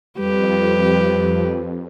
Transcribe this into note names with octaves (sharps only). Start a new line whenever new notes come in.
F2 G3 G4 B4